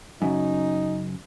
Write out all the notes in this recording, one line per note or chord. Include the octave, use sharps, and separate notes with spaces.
F#2 C#3 D#4